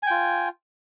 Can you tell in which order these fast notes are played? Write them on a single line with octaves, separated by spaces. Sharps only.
G#5 G5 F4